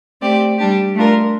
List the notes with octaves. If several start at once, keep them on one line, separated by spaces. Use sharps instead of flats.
A3 C4 G4 D5
G3 D4 G4
A3 D4 F4 A#4